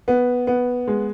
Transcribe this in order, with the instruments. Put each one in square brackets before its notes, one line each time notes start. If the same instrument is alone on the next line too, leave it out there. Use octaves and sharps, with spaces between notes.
[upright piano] B3
B3
G#3